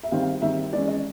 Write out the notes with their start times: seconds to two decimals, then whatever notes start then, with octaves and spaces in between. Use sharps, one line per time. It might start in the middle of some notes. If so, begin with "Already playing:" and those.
0.03 E5
0.12 D#3 G3 C4 F5
0.22 F5
0.42 D#3 G3 C4 E5
0.72 E3 G#3 C#4 D5
0.88 D#5